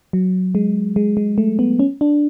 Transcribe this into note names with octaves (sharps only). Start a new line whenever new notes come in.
F#3
G#3
G#3
G#3
A3
B3
C#4
D4